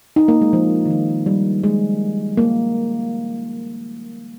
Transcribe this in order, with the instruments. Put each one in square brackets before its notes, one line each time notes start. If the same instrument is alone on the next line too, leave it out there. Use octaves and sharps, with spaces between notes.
[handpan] D#4
A#3
G#3
F3
D#3
F3
G3
G#3
A#3